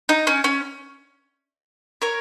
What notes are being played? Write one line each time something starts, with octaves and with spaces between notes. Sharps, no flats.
D#4
C#4
C#4
A#4 C#5